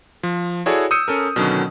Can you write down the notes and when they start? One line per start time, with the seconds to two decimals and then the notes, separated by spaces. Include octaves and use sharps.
0.23 F3
0.66 E4 F#4 G#4 A4 C#5 D5
0.91 D#6 E6 G6 C#7 D#7
1.08 C#4 A4 A#4
1.36 B2 D3 D#3 F#3 C#4